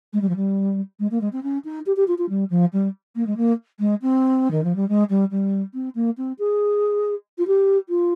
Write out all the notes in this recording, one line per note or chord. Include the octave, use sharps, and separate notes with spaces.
G#3
G3
F3
G3
G#3
A#3
G#3
C4
C#4
D#4
G4
G4
F4
F4
G3
F3
G3
A#3
G#3
A#3
G#3
C4
D#3
F3
G3
G#3
G3
G3
C4
A#3
C4
G#4
F4
G4
F4